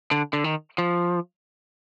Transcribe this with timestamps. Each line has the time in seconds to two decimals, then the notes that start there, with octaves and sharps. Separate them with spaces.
0.11 D3
0.33 D3
0.44 D#3
0.78 F3